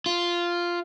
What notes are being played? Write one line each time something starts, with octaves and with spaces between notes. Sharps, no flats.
F4